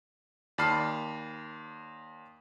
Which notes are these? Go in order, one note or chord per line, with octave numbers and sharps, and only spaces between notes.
D#2 D5 A5 B5 F6 C7